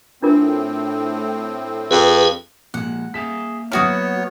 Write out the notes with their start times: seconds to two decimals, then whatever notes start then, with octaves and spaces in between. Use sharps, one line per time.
0.22 A2 C4 D4 F4 A#4
1.91 F2 G#4 B4
2.74 A#2 F3 G#3 F#5
3.14 A#3 G#4 E5 F5 B6
3.72 F#3 B3 E4 F#4 C#5 D#6 F6